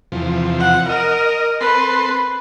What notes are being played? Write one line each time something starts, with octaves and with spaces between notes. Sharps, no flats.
E2 C3 F3
F#5
A#4 D#5
C4 A4 B4 C6